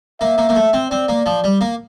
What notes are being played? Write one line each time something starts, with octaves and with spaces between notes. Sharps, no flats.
A#3 E5
A#3
A#3
A3
C4
C4 D5
A#3
F3
G3
A#3